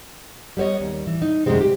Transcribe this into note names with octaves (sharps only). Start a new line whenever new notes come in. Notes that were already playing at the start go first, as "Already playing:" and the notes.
G3 B3 C5 C#5 D#5
D#2
E3
D#4
F#2 C3 D#3 G3 G#3 C4
G4